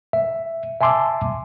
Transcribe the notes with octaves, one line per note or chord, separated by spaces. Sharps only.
E5
E5 G#5 A5 C6 D6 E6